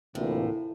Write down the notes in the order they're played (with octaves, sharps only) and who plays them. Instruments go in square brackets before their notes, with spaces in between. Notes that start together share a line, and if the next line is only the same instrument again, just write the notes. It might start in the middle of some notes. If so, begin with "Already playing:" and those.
[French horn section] D2 C3 E3 A#3 F4 [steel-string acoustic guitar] A2